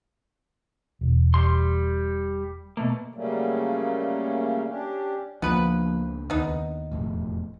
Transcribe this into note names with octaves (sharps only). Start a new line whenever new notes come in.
E1
G3 C6
B2 A3 A#3
C#3 F#3 G3 A3 A#3 C#4
C#4 D4 G4
C#2 F3 A#3 B3 D4 B4
D#2 B3 D#4
E1 F2 A2